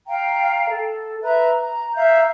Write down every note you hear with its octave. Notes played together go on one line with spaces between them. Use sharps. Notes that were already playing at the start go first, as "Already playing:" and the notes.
F5 G5 A#5
A4
B4 E5 A#5
A#5
E5 F5 A#5 G6